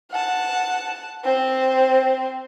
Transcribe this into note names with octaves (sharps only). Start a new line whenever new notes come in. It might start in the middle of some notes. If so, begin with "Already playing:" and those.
F#5 A5
C4 C5